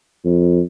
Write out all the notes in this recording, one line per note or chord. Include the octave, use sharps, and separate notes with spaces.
F2